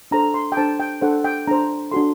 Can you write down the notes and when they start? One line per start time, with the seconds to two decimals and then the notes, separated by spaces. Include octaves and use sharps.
0.11 D4 A4 C5 A#5
0.34 C6
0.52 G5
0.57 D4 A4 C5 A5
0.80 G5
1.02 D4 A4 C5 F#5
1.24 G5
1.48 D4 A4 C5 A#5
1.92 D4 F#4 A4 C6